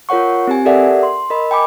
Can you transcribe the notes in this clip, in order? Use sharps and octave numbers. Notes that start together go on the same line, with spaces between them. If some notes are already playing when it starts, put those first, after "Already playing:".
F4 A#4 C#5 F#5 C#6
C4 G4 G#5
G4 A4 A#4 D5 E5 F#5
C6
A#4 D#5 B5
G5 G#5 B5 D6